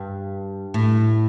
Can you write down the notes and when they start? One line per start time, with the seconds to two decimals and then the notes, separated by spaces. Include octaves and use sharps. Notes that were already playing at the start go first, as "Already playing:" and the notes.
Already playing: G2
0.74 A2